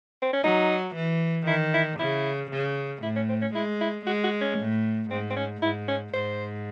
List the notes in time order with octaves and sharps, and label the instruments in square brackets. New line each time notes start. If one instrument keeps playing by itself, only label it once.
[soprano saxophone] C4
C#4
[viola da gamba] F#3 [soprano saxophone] D#4
[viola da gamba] E3
[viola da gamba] D#3 [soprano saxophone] E4
[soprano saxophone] E4
[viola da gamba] C#3 [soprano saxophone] E4
[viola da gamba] C#3
[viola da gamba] A2 [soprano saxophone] E4
[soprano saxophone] C#4
C4
C#4
[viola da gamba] G#3 [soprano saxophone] E4
[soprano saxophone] E4
[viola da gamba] G#3 [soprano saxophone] F#4
[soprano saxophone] F#4
C#4
[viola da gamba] A2
[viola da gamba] G#2 [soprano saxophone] C4
[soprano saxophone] C4
C#4
[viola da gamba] G#2 [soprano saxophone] E4
[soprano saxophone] C#4
[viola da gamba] G#2 [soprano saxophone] C5